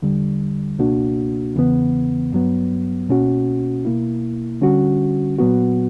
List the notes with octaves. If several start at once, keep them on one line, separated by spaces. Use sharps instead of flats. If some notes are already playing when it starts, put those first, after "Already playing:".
E2 D3 G3
C#2 B2 A#3 D4 F#4
E2 C#3 E3 B3
G2 F#3 B3
C#2 B2 A#3 C#4 F#4
B2 A#3 E4
D3 G3 C#4 F#4
A#2 F#3 B3 F#4